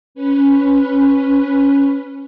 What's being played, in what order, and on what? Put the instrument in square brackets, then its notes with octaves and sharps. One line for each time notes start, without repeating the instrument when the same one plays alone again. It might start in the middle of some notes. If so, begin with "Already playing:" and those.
[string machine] C#4 B4